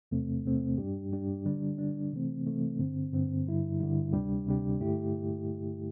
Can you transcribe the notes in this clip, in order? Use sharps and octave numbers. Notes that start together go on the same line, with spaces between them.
E2 C3 A3 C4
E2 C3 A3 C4
G2 G3 D4 G4
G2 G3 D4 G4
D3 G3 D4
D3 G3 D4
C3 E3 A3 C4
C3 E3 A3 C4
G2 D3 C4
G2 D3 C4
G2 D3 G3 E4
G2 D3 G3 E4
D2 C3 G3 D4 G4
D2 C3 G3 D4 G4
G2 D3 A3 E4 G4